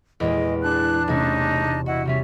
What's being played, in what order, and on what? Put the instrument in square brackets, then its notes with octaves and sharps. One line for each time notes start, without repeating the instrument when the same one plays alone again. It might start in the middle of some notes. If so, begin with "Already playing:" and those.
[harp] E2 A#2 [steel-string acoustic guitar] E3 G#3 G4 [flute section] D#5
[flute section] D4 A5 [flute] F#6
[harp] E1 C3 [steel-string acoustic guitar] G3 A3 C#4 [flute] D#4
[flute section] E4 D#5 F#5 [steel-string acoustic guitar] F#4
[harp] C3 G3 C#4 [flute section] E5